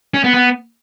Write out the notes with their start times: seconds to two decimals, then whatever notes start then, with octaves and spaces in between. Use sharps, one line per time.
0.14 C#4
0.24 B3
0.34 B3